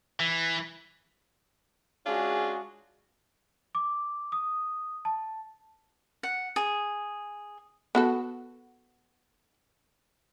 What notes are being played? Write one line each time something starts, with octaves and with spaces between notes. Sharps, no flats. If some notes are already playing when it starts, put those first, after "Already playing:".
E3
G#3 C#4 D4 F4 F#4 G#4
D6
D#6
A5
F#5
G#4
B3 F#4 A4